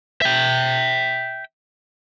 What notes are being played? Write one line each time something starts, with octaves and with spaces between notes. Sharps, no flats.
E5 G5